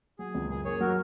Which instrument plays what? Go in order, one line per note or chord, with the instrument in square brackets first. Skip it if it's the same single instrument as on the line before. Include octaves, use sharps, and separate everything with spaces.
[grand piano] F#3 [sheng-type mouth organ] G#4
[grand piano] C#2
[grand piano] F#2 [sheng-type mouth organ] G#4
[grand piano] A#3 [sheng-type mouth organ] G#4 C#5
[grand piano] F#3 [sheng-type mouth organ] F#4 A#4